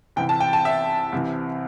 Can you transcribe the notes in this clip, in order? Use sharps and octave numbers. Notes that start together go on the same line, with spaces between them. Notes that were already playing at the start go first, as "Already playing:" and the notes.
C2 C3 E3 G5
A5
G5
A5
E5
C2 C3 E3